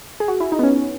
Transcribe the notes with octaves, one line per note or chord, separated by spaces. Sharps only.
G#4
F#4
E4
D#4
B3
C#4